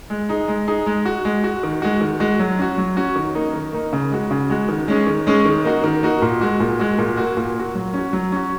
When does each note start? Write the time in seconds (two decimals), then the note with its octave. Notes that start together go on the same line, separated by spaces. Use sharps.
0.10 G#3
0.29 D#4 G#4
0.48 G#3
0.68 D#4 G#4
0.86 G#3
1.05 F#4
1.25 G#3
1.44 F#4
1.63 D#3
1.82 G#3 F#4
2.01 D#3
2.20 G#3 F#4
2.39 F#3
2.59 C#4 F#4
2.78 F#3
2.97 C#4 F#4
3.16 D#3
3.35 A#3 D#4
3.54 D#3
3.73 A#3 D#4
3.93 C#3
4.12 G#3 F#4
4.31 C#3
4.50 G#3 F#4
4.69 D#3
4.88 G#3 C#4 G#4
5.07 D#3
5.27 G#3 C#4 G#4
5.46 D#3
5.65 A#3 D#4 F#4
5.84 D#3
6.03 A#3 D#4 F#4
6.22 A#2
6.41 G#3 F#4
6.60 A#2
6.79 G#3 F#4
6.99 A#2
7.17 A#3 F#4
7.37 A#2
7.56 A#3 F#4
7.75 F#3
7.94 C#4 F#4
8.13 F#3
8.32 C#4 F#4